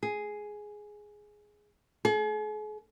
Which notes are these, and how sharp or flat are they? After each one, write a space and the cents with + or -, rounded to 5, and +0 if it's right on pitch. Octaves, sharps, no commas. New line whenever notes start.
G#4 +5
G#4 +45